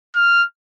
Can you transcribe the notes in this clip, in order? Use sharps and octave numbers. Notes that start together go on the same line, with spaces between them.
F6